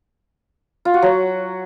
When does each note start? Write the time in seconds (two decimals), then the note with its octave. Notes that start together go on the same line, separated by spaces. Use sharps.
0.85 F4
0.94 F#4
1.02 F#3